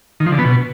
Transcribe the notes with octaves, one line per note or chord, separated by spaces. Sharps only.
D#3
F3
D3
B3
B2